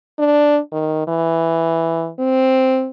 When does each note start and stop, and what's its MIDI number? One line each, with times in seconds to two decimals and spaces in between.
0.19 0.59 62
0.72 1.06 51
1.07 2.10 52
2.19 2.91 60